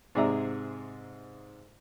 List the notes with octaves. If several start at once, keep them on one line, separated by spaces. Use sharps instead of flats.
G#2 C3 G#4 D5 E5 A#5